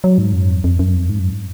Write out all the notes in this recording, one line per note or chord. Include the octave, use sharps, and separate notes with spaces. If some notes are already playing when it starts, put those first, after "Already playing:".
F#3
G#2
F#2
F2
F2
F#2
F2
G#2
F#2